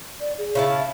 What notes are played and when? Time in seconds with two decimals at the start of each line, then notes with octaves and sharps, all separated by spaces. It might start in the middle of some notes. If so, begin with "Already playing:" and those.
0.20 D5
0.38 G#4
0.55 C#3 E4 A5
0.78 E5